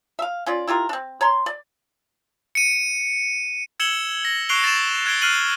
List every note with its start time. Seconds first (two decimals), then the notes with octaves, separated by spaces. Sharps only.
0.19 E5 F5
0.46 C#4 F4 D5
0.67 E4 F4 G4 A#4
0.89 C4 D4
1.21 C#5 A#5 C6
1.46 D5
2.55 C#7 D#7
3.80 E6 G#6 C#7 E7 F#7 G7
4.25 A#6
4.49 C#6 F#6 C7 D7 F7 G7
4.64 A6 A#6 E7
5.06 F#6 G#6 C7 D7 G7
5.22 F6 F#6 C7 D#7 F#7